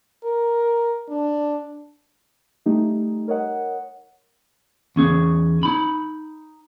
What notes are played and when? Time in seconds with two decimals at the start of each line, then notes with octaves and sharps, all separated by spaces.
0.24 A#4
1.10 D4
2.66 G3 A3 D#4 G4
3.28 A#4 C#5 D#5 F#5
4.96 E2 C#4 G#4
5.63 D#4 B5